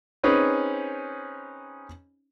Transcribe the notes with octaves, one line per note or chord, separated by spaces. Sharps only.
C4 C#4 D#4 G#4 B4